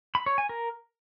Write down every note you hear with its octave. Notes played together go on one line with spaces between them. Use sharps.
B5
C#5
G#5
A#4